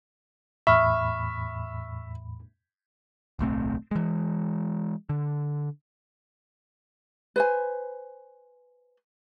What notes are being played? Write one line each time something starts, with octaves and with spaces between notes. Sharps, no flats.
E2 A2 E5 B5 C#6 F6
D1 B1 A3 C4
E3 G#3
D3
B4 C5 G#5